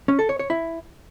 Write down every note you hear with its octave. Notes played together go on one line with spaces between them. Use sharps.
C#4
A4
C#5
C#5
E4